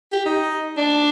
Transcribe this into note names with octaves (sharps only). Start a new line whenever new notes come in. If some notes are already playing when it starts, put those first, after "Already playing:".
G4
D#4
D4